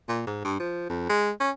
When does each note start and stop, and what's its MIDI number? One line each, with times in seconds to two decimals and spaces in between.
0.08 0.22 46
0.27 0.43 44
0.45 0.58 43
0.60 0.87 53
0.89 1.09 41
1.09 1.31 56
1.40 1.51 61